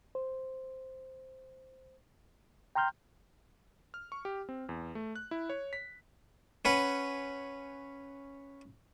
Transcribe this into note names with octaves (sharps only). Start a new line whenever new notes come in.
C5
G5 A#5 C6 F6 G6
F6
C#6
G4
C4
E2
A3
F#6
E4
C#5
B6
C#4 B4 F#5